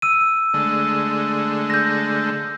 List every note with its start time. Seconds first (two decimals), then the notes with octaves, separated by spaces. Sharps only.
0.02 E6 D#7
0.54 D3 G#3 A3
1.70 G6 A#6